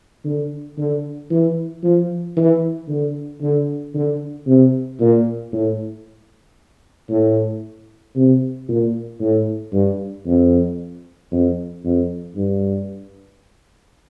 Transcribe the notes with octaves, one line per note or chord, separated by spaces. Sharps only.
D3
D3
E3
F3
E3
D3
D3
D3
C3
A#2
A2
A2
C3
A#2
A2
G2
F2
F2
F2
G2